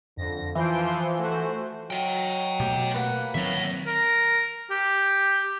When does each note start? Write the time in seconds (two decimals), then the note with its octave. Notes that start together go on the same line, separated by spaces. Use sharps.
0.17 F2 D3 A#6
0.55 E3 F3 C6 G6 D7
0.86 C6
1.19 A3 F#4 C5
1.90 F#3 D#5 G5
2.60 B2 A3 G4
2.94 A#3 B4 F#5
3.35 D#3 F#3 C4 C#5 E5
3.87 A#4
4.71 G4